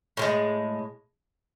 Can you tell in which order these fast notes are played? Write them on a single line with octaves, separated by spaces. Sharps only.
A2 F3 G#3